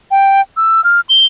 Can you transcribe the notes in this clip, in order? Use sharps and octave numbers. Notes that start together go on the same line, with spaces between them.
G5
E6
F6
G7